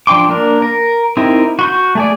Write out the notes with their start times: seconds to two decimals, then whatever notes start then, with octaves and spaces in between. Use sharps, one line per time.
0.07 F3 D4 G5 C6 D6
0.29 A#3 D4 A#4
0.62 A#4
1.17 C4 D#4 E4 G4 A#4
1.59 F#4 C6 G6
1.95 A3 G#4 D5